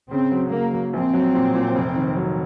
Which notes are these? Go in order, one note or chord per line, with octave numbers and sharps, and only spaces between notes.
C#3 C4
F#3
C#3 A#3
F#3
A#1 C4
F#3
A#2
A#2
F1
D#3
F#3